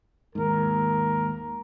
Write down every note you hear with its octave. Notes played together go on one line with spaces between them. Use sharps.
D#2 G#2 A#4